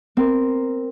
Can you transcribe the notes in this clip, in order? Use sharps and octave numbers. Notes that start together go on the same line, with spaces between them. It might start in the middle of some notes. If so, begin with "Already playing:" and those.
C4 A#4